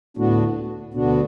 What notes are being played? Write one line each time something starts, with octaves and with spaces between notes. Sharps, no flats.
D2 A2 D3 B3 D4 F#4
D2 B2 D3 B3 D4 F#4